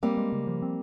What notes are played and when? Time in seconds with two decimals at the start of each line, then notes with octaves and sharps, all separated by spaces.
0.03 G3 A#3 C4
0.17 G#3
0.32 C#3
0.47 F3
0.62 C4